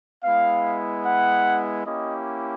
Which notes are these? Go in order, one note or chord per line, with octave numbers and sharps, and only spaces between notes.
G#3 B3 E4 F5
F#5
A#3 C#4 E4 G4 D#5